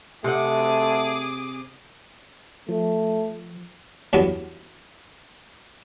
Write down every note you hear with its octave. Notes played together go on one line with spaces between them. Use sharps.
C3 A3 G#4 D#5 F#5 D6
F3 A3
E2 G2 E3 F#3 B3